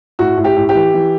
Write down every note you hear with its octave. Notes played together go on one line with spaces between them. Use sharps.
A2 F#4
A2
G4
A2
G4
E3
E3